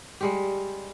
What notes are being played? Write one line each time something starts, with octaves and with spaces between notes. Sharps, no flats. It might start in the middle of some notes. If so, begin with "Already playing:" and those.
G3 G#3 G4